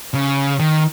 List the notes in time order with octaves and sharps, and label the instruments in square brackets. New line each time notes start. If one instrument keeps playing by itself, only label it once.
[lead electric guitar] C#3
D#3